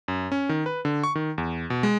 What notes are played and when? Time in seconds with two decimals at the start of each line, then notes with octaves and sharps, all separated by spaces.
0.08 F#2
0.32 C#4
0.49 D#3
0.66 B4
0.85 D3
1.04 C#6
1.15 D#3
1.38 E2
1.70 B2
1.83 G#3